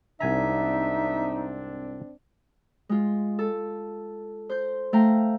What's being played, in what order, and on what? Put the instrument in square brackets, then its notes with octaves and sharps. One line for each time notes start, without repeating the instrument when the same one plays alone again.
[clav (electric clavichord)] C2 G#5 A#5 [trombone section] G#2 C4 D4 [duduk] D#4 [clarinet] E5
[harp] G#3 F4
A4
C5 G6
A3 F5 G5 A#5